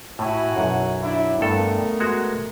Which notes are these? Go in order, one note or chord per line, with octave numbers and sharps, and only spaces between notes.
A2 E4 F#4 G#5
B1 F#2
D4 E4
G2 A3 B3 A4 A#4
G#3 F#4